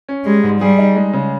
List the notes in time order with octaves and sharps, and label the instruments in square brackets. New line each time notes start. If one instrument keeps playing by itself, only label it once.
[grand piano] C#4
[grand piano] G3 [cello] G#3
[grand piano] G#2
[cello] G3 [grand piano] G#4
[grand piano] D#4
G#3
C#3